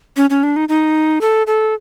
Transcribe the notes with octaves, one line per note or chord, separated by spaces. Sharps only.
C#4
C#4
D4
D#4
D#4
A4
A4